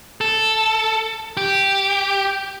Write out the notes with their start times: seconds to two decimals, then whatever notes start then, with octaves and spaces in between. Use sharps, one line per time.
0.21 A4
1.37 G4